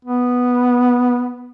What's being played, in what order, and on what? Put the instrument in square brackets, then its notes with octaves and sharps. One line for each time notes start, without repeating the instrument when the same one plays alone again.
[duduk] B3